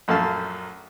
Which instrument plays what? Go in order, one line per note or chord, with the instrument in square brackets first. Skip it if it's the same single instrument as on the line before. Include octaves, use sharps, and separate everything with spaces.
[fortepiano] A#1 F#2 A3 F5 A5